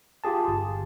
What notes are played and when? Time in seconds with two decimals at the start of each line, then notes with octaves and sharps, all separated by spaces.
0.24 F4 G4 G#4 A5
0.48 G1